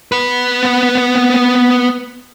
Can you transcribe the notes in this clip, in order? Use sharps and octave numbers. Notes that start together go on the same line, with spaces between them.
B3 B4